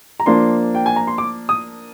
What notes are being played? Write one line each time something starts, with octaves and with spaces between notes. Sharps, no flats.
A#5
F3 A#3 D4 C6
G5
G#5
A#5
C6
D6
D#6